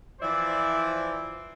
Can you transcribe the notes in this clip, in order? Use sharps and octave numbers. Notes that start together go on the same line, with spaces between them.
E3 F3 E4 C5 D5